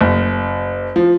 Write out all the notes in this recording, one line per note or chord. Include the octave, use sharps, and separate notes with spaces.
F#1
F3